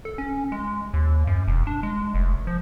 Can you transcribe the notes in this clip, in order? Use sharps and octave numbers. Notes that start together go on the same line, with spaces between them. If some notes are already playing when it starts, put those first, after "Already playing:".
A4
C#4
G#3
D#2
F#2
E1
D4
G#3
F1
F3